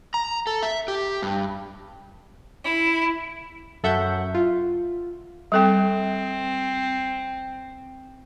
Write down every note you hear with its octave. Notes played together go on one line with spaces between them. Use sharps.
A#5
A4
E5
G4
G2
E4
F#2 A4 E5 F#5 C#6 G6
F4
G3 C4 A4 G5